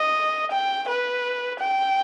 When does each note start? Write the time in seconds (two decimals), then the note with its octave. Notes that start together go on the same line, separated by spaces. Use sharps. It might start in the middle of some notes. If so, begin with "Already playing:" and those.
Already playing: D#5
0.52 G5
0.88 B4
1.59 G5